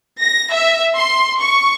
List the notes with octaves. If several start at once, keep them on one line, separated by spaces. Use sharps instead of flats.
A#6
E5
C6
C#6